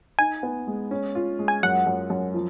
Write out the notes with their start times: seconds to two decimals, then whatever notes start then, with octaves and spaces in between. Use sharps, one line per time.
0.19 D#4 G#5
0.43 B3
0.67 G#3
0.91 C#4
1.15 F4
1.39 G#3
1.48 G#5
1.63 F#2 F#5
1.87 F#2
2.10 F#2
2.34 F3